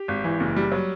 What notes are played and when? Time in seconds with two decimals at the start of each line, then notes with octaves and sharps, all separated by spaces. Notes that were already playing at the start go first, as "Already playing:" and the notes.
Already playing: G4
0.08 G#1
0.24 E3
0.40 F#1
0.56 G3
0.72 F#3